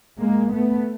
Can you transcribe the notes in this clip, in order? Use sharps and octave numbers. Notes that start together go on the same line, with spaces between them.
G#3 A#3
A3 B3